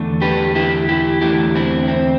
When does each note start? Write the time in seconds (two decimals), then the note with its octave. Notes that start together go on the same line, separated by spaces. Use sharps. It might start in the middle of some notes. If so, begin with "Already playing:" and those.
Already playing: E2 D3 A3
0.22 G4 B4
0.55 E4 G4
0.89 E4 G4
1.21 E2 D3 A3 E4 G4
1.55 C4 E4
1.88 C4